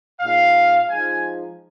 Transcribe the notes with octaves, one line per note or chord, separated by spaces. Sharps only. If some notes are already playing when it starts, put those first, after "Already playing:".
A#2 G#3 D#4 F5
F3 G#3 D#4 G#5